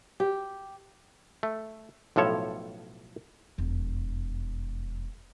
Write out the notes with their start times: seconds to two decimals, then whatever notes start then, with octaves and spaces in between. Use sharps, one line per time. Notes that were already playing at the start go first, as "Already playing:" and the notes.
0.20 G4
1.43 A3
2.16 B1 A2 F3 A4 C#5
3.58 E1 F2